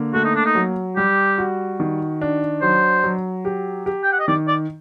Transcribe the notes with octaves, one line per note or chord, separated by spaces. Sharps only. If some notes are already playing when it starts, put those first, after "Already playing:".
Already playing: D3 A#3
A3 F#4
D#4
D4
D#4
F#3
G3 G4
F#4
D#3
D4
F#3 C5
F#3
G4
G4
G5
F#5
D#5
D#3 D5
D5